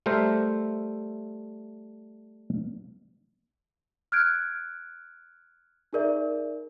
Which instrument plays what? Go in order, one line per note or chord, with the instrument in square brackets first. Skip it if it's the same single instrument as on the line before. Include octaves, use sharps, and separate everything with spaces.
[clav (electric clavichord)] G3 A3 A#4 C5 E5
[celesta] F6 F#6 G#6 D7
D#4 G#4 A#4 D5 E5